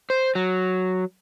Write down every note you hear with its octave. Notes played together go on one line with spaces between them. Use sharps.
C5
F#3